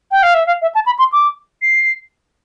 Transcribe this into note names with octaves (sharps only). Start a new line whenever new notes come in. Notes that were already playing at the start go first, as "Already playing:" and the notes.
G5
F5
E5
F5
E5
A5
B5
C6
D6
C7